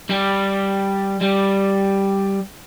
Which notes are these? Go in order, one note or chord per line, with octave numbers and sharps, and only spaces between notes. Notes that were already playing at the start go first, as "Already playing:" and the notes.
G3
G3